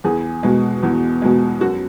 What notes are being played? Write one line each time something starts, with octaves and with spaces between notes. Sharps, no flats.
E2 G#4
B2 G#3
E2
B2 G#3
F#2 F#4